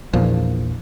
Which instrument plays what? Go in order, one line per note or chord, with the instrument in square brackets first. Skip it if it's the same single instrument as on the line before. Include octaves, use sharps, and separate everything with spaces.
[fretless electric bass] A#1 E2 A#2 F3